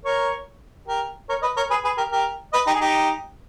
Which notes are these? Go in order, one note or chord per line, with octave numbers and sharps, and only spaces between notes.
A#4 C#5
G4 A#4
A#4 C#5
B4 D#5
A#4 C#5
G#4 B4
G#4 B4
G4 A#4
G4 A#4
B4 D#5
D#4 G4
G#4
D#4 G4